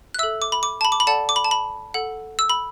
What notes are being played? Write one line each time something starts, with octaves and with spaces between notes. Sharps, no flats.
F#6
A4 E5 E6
D6
B5
D6
A5
B5
D6
B5
A4 D5 F#5 A5
D6
B5
A5
B5
A4 F#5
E6
B5